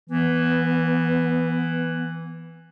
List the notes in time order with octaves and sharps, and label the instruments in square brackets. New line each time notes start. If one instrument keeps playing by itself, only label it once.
[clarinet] E3 [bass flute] B3